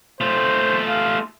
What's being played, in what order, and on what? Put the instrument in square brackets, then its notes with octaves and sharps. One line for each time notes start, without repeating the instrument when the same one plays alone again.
[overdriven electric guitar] A3 F4 [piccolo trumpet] C5
[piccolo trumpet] F5